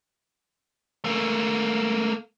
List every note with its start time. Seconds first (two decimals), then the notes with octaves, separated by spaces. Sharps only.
1.04 A3 A#3